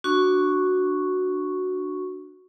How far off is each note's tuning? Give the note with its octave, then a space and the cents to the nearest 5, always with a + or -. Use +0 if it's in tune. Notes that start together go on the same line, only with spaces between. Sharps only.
D4 +15 F#4 +0 C#6 +0